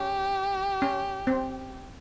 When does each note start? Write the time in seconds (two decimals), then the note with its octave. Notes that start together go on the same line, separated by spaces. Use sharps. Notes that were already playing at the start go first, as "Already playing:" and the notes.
Already playing: C#4 G4
0.82 C#4
1.27 C4